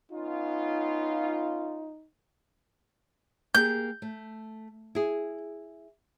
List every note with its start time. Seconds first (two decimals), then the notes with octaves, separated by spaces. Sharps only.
0.12 B3 C#4 D#4 F4
3.55 A#3 G4 G#4 G6
4.02 A3
4.95 E4 G#4